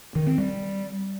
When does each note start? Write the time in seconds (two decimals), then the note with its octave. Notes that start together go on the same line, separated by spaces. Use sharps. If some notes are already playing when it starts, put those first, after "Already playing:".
0.15 D#3
0.27 C4
0.38 G3